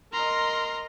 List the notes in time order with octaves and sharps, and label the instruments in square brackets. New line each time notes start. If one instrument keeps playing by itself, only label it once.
[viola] A#4 D#5 [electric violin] A#5 C6